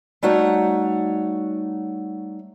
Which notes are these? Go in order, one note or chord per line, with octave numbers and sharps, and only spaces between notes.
G3 A3 D#4 F#4 C#5 F#5